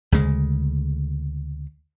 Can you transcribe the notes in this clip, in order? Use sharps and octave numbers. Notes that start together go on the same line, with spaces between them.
D2 C#3 G#3